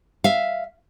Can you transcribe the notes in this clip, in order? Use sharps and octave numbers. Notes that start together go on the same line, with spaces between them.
E5 F5